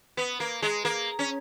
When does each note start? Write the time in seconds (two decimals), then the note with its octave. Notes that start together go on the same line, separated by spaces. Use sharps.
0.17 B3
0.40 A#3
0.62 G#3
0.85 A#3
1.19 C#4